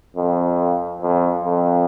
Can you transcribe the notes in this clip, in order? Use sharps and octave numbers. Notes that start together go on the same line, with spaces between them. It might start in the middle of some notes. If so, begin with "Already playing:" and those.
F2
F2
F2